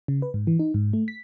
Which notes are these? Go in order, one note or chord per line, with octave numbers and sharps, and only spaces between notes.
C#3
B4
G#2
E3
D#4
G#2
A3
B6